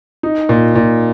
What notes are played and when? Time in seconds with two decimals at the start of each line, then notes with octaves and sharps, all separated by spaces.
0.23 D#4
0.49 A#2
0.75 A#2